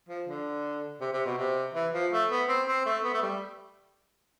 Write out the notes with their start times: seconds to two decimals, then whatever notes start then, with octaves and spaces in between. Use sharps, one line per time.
0.08 F3
0.27 D3
1.01 C3
1.13 C3
1.26 B2
1.38 C3
1.74 E3
1.93 F3
2.12 A3
2.30 B3
2.48 C4
2.68 C4
2.86 A3
3.04 B3
3.14 A3
3.22 G3